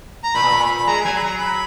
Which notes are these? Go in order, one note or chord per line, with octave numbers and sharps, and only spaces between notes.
A#5
A#2 B5
B2
A#2
B5
G#3 A#5
F#3 G#5
B5
F#3 A#5
B5